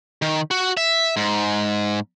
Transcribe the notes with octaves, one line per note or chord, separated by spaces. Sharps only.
D#3
F#4
E5
G#2